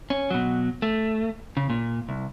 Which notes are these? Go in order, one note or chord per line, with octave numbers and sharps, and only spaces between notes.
C#4
B2 F#3
A3
C#3
A#2
C2